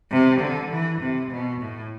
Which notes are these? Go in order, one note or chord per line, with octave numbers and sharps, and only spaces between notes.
C3
D3
E3
C3
B2
A2